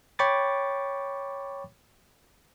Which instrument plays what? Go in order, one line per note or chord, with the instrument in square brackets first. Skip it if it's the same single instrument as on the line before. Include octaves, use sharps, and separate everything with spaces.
[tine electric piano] C#5 G5 B5 C#6 D6 A6